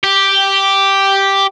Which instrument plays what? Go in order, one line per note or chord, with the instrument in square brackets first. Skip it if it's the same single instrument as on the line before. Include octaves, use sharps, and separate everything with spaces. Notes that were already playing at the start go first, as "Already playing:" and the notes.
[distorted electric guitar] G4